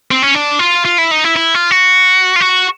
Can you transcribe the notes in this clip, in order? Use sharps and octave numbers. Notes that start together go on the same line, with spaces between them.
C4
C#4
D4
F4
F4
E4
D#4
E4
E4
F4
F#4
F4
F#4